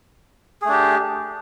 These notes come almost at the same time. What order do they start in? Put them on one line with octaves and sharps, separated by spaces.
G#4 A3 D4 G4